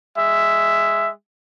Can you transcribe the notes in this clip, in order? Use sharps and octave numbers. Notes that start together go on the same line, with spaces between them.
G#3 E5